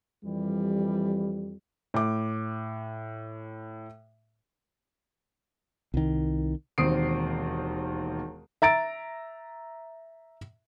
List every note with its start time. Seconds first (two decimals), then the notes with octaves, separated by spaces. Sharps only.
0.24 F2 E3 G3
1.94 A2 D6
5.94 C2 D#3
6.78 E1 D#2 C4 D#6 C7 D7
8.62 E5 A#5 A6 D7